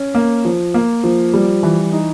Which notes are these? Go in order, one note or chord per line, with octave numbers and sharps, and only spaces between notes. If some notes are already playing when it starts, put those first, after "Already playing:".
Already playing: C#4
A#3
F3
A#3
F3
G3
E3
D#4